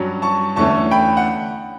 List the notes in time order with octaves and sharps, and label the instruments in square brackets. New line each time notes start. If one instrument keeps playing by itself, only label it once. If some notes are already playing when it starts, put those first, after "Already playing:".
Already playing: [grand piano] G2 F#3 C#4
A5 C#6
E2 D3 A3 C#4 A5 C#6
G5 B5
F#5